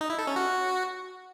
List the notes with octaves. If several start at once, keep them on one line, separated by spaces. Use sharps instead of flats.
D#4
E4
A4
C#4
F#4